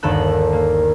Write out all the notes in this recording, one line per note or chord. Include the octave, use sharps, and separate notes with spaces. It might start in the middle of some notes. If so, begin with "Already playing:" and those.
G1 D#2 A4 F#6
A#3